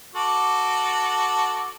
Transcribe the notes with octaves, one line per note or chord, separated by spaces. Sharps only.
F#4 A4 D6